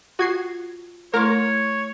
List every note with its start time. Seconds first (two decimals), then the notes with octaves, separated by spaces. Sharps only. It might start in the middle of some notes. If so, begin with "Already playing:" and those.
0.19 F4 F#4 G#6 C7
1.14 A3 E4 A#4 C#5 C6